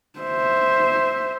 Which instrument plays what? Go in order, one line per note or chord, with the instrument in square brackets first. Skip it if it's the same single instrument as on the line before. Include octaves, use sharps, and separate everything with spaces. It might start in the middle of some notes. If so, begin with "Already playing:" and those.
[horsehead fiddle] C5 E5